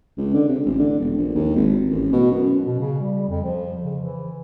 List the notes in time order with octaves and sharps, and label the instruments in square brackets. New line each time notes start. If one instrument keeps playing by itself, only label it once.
[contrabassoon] C#2
D3
C3
A1
D3
E1
A#1
D#2
G#1
A1
B2
F#2
[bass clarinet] B2
C#3
G3
F2
F3
C#3
E3